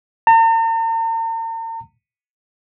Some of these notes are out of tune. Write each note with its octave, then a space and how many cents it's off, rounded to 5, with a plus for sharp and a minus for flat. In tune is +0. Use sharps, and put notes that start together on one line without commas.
A#5 -45